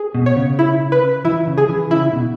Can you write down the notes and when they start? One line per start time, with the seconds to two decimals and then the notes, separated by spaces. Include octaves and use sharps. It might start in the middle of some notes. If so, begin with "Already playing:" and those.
Already playing: G#4
0.15 B2
0.26 C#5
0.36 C#3
0.59 E4
0.92 B4
1.25 E3 E4
1.47 C#3
1.58 G#4
1.69 E3
1.90 C#3 E4
2.13 B2